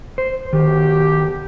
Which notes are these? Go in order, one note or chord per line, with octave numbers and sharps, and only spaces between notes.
C5
B1 D#3 G4